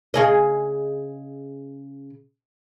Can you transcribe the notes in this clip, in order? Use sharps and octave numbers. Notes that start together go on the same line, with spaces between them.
C#3 G#4 D#5